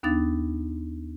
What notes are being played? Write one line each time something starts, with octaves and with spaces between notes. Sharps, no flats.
D#2 B3 D4 D#4 F5 A6